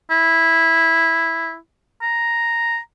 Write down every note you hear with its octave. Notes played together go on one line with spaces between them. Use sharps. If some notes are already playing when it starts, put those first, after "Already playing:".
E4
A#5